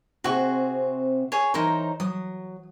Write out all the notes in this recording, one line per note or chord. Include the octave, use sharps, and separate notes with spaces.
C3 C4 F#4 G#4 C#6
G#4 C#5
E3 D#4 A#4 C5 C#5
F#3 D#6